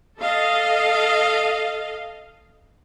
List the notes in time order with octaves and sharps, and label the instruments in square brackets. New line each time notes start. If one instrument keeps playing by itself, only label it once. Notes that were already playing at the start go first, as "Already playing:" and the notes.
[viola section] A4 D#5 F5